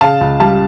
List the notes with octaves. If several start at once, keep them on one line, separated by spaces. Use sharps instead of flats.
C#3 F5 A5
C#2
G3 F5 A5